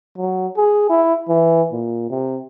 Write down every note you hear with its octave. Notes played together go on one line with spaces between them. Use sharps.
F#3
G#4
E4
E3
A#2
C3